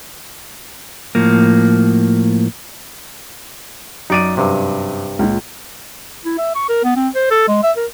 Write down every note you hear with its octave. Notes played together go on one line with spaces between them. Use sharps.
A2 F3 A#3
F#2 D#4 D5 D7 D#7
G2 C3
C#2 A#2
E4
E5
C#6
A#4
B3
C4
C5
A4
G#3
E5
A#4